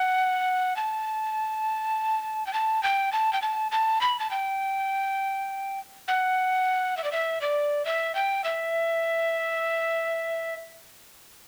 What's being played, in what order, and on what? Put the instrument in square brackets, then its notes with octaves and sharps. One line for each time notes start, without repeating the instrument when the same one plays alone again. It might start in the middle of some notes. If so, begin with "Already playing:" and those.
Already playing: [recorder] F#5
A5
G5
A5
G5
A5
G5
A5
A5
B5
A5
G5
F#5
E5
D5
E5
D5
E5
G5
E5